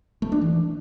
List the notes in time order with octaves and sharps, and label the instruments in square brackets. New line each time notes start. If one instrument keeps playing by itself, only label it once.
[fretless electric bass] A3
D4
E3